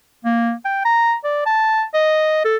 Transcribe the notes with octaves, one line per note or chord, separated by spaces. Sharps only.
A#3
G5
A#5
D5
A5
D#5
A4